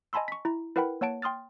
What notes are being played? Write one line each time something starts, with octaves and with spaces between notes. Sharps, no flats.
D#5 G#5 A5 B5 C6 E6
C#6 B6
E4 A#5
E4 A#4 B4 F#5 G5 B5
A#3 C#5 F#5 A5 D7
G5 C6 D#6 F6 A6